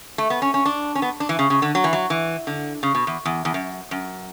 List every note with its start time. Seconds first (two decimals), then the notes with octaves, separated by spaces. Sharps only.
0.18 A3
0.30 B3
0.42 C#4
0.54 C#4
0.65 D4
0.95 C#4
1.02 B3
1.20 D4
1.29 E3
1.39 C#3
1.50 C#3
1.62 D3
1.75 F#3
1.84 E3
1.93 F#3
2.10 E3
2.47 D3
2.83 C#3
2.95 B2
3.07 E2
3.25 E2
3.45 E2
3.54 F#2
3.91 F#2